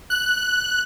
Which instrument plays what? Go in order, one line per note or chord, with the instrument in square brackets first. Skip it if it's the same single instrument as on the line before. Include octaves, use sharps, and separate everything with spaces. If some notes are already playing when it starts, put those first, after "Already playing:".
[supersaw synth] F#6